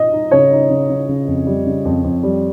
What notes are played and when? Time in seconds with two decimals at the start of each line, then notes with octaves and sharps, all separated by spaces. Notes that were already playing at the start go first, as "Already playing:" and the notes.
Already playing: D#5
0.12 D#4
0.31 C#3 C#5
0.51 D#4
0.70 C#3
0.90 C#3
1.08 C#3
1.28 F2
1.47 G3
1.66 C#3
1.85 F2
2.04 F2
2.23 G3